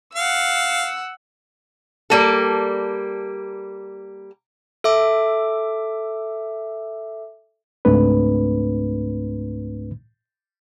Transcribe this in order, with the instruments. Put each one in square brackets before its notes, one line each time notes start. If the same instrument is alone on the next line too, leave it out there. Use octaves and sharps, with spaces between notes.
[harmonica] F5 [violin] F#5 E6
[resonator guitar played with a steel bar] G3 A#3 A4
[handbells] A4 E5 D6
[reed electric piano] C#2 G#2 A3 C4 D4 B4